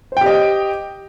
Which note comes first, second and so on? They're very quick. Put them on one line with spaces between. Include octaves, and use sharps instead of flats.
C5 G5 G4 D#5